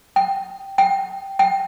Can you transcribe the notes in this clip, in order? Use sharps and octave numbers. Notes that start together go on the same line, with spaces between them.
G5
G5
G5